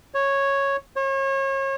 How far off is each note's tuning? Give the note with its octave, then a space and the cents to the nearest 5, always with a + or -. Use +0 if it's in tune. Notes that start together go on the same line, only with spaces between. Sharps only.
C#5 -5
C#5 -35